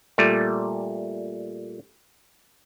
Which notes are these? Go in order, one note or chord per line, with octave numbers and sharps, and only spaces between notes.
A#2 G3 A3